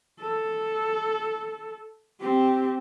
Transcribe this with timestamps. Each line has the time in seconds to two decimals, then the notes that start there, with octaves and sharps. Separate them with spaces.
0.21 A4
2.21 C4 G4